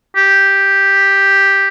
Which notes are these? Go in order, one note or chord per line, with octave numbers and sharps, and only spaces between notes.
G4